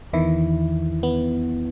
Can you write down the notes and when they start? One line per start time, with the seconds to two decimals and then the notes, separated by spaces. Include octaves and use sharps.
0.13 E2 D#3 E3 E4
1.03 B3